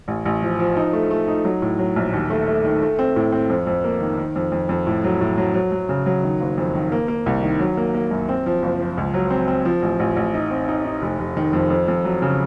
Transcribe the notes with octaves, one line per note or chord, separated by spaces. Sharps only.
A1
A1
F3
F3
D#4
A3
A3
D#4
F#3
A2
F#3
A#1
D#2
A3
A3
D#3
A3
C4
A2
C4
F2
F2
A#3
D#3
D#3
F2
F2
F2
A2
F#3
A2
F#3
F#3
F#3
C#3
F#3
D#3
F#1
F2
D#3
A#3
A#3
C2
D#3
F#3
A#3
A#3
F#2
C4
F3
F#1
F3
C#2
F#3
C4
C4
F3
A1
A1
A1
D#4
C4
D#4
D#4
F1
F1
D#3
F2
F2
F2
F#3
C#3